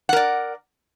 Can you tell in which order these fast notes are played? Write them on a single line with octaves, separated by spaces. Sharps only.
F#5 A#4 D5